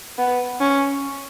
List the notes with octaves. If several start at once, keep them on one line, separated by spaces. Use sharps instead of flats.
B3
C#4